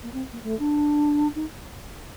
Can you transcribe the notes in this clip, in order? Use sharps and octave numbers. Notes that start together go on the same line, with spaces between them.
A#3
C4
A#3
A3
D4
D#4